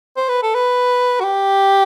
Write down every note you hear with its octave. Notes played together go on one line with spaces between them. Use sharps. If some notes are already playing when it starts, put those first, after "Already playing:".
C5
B4
A4
B4
F#4
G4